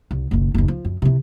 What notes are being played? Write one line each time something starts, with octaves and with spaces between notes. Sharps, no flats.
C2
F#1 B1
F#1 D#2
F3
F#2
C3 E3